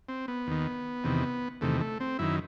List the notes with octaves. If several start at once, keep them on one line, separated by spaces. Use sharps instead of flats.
C4
B3
D#2 D#3
E2 C3 D#3
E2 C3 D#3 A3
A3
C4
F#2 D#3 E4